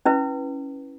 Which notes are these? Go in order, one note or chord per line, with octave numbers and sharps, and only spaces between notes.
C#4 E4 B4